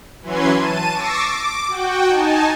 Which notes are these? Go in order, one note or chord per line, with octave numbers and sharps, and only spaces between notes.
E3 F#3 C#4 B4 C6 G#6
A5 D#7
C#6 D6 E6 A6 A#6 C7
D6
F#4 G5
D#4 G#5 A5